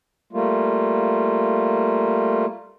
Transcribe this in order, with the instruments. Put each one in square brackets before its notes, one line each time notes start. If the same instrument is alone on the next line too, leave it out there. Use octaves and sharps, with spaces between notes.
[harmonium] G3 A3 A#3 F4